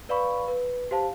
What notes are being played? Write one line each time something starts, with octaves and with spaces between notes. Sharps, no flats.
B4 D5 F5 B5 C#6
B4
G4 C5 F5 A5